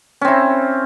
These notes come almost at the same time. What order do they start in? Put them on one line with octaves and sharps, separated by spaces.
C#4 C4 E4